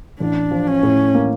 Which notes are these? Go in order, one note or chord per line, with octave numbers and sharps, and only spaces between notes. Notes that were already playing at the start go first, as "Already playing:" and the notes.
A1 D4
F3
C#4
A2
A#3